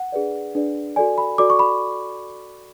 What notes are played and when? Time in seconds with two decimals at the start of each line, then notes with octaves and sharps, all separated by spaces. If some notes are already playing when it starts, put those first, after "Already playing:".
Already playing: F#5
0.12 D4 G#4 B4 D5
0.55 D4 G#4 B4 D5
0.96 F#4 A4 D5 G#5
1.18 B5
1.38 F#4 A4 D5 D6
1.50 C#6
1.59 B5